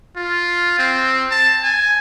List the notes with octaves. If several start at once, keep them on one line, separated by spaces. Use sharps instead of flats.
F4
C4
A5
G#5